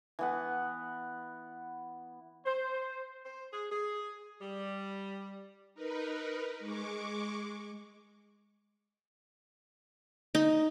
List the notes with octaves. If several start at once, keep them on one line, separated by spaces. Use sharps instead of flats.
E3 B3 F#5
C5
C5
G#4
G#4
G3
D#4 A#4 B4
G#3 C#6 D6
D#4